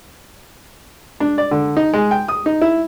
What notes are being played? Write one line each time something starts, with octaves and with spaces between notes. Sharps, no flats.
D4
D5
D3
D#4
G#3
G5
D#6
D#4
E4